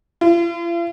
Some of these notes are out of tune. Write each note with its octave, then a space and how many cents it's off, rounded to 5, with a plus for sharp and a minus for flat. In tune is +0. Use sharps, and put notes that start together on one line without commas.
F4 -45